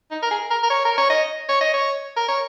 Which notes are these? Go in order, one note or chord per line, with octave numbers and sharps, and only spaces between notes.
D#4
A#4
G#4
A#4
A#4
C#5
A#4
C#5
D#5
C#5
D#5
C#5
A#4
C#5